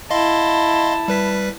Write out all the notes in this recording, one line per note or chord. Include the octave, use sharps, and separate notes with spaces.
E4 D#5 F5 A5 C6
G3 B4 B6